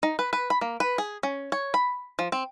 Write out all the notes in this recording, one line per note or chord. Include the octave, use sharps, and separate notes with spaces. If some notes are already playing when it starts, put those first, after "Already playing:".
D#4
B4
B4
B5
A#3
B4
G#4
C#4
C#5
B5
F3
C4